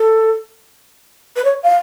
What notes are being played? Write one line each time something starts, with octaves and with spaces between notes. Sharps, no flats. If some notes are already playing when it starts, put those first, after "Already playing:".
Already playing: A4
B4
C#5
F5